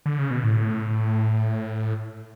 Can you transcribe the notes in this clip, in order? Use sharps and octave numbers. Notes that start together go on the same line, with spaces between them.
D3
C#3
B2
A2